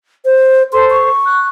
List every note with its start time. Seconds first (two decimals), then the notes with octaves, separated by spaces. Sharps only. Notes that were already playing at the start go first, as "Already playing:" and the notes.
0.25 C5
0.73 A4 C5 C6
0.90 C#6
1.25 F#6